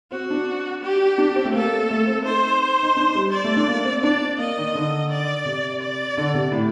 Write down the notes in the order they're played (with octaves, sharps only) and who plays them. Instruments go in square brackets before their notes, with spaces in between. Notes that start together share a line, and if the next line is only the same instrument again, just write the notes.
[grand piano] C4 [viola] F#4
[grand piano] D4
[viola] G4
[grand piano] D4
C4
A3
[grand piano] A#3 [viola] A4
[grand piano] A3
C4
[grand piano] D#4 [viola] C5
[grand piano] D#4
D4
G3
[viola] D5
[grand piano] A3
D4
A#3
C4
[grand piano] D4 [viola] D5
[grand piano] A#3 [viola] D#5
[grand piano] D#3
D3
[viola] D5
[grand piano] C3
[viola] D5
[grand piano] D3
C3
A2